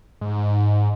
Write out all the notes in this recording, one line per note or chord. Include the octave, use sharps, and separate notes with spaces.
G#2